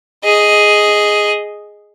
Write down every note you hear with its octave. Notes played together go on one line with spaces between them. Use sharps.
G#4 D#5